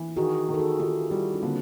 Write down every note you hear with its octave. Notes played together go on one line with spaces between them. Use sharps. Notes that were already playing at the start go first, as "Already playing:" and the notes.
Already playing: E3
D#3 F#4 G#4
D#3
A4
F#4 G#4
D#3 F4 G4
G3 E4 F#4
C#4
D3 A#3 C4